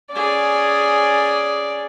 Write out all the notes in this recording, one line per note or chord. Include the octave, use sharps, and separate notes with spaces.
C#4 G#4 D5